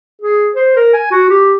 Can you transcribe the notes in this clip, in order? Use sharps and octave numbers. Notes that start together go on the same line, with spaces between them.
G#4
C5
A#4
G#5
F#4
G4